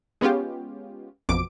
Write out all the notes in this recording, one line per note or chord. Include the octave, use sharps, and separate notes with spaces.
G#3 B3 C#4 F4 G4
A1 F2 B2 D6 D7